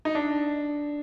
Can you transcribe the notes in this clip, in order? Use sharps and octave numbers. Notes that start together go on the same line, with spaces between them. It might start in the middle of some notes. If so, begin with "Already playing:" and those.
D#4
D4